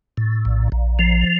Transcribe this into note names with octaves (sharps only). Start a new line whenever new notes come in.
A2
A#1
A#1
F3